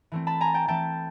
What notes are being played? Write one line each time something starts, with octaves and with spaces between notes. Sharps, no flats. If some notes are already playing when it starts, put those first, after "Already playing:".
E3 A3 C4
A5 B5
G#5 A#5
G5 A5
E3 A3 C4 G5 A5